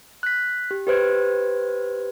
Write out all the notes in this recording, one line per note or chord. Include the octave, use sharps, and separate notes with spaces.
F#6 B6
G4
G4 B4 C5 G#6